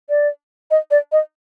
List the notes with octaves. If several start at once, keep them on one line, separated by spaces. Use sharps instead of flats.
D5
D#5
D5
D#5